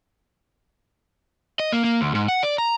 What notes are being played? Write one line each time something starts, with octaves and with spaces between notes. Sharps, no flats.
D#5
A#3
A#3
D2
G#2
F#5
D5
A#5